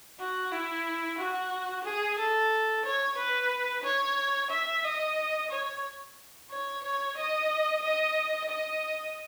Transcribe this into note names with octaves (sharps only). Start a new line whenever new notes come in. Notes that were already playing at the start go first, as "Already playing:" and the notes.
F#4
E4
F#4
G#4
A4
C#5
B4
C#5
E5
D#5
C#5
C#5
C#5
D#5
D#5
D#5